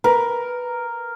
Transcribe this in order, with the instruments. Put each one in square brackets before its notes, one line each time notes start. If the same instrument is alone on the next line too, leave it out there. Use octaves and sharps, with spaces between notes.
[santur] A#4 [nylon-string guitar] B4